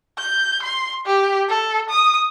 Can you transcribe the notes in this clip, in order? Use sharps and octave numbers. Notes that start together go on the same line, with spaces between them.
G6
C6
G4
A4
D#6